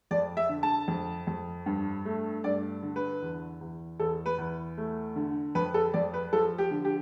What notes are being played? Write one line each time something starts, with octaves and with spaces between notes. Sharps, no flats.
F2 D5
E5
D3
A5
F2
F2
G2
A3
G2 D5
D3
B4
E2
E2
E2 A4
B4
E2
A3
D3
F2 B4
A4
F2 D5
B4
F3 A4
G4
D3
G4